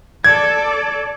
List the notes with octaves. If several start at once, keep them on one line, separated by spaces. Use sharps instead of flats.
A4 D5 G#6